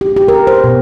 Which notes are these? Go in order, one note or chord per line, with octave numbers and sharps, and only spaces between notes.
G4
G4
A#4
C5
B2